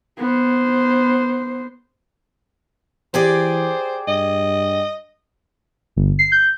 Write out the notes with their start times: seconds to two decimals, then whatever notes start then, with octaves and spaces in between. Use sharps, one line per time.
0.18 B3 C5
3.14 E3 G4 G#4 C5 D5
4.08 G2 D#5
5.96 G1
6.19 C7
6.32 G6